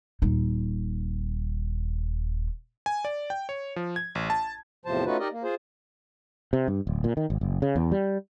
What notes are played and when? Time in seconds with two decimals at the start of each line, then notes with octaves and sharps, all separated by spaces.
0.22 D#1 D#4
2.86 G#5
3.05 D5
3.30 G5
3.49 C#5
3.76 F3
3.96 G#6
4.15 A1
4.30 A5
4.86 E2 A2 C3 F3 C5 A5
5.06 A3 C#4 D#4 F4 F#4 B4
5.20 D#4 G4 A#4 D5 D#5
5.32 A#3
5.44 F4 G#4 C5
6.53 C3
6.68 G2
6.87 D1
7.04 A#2
7.17 D#3
7.30 G#1
7.41 F#1
7.62 C#3
7.76 E2
7.91 G3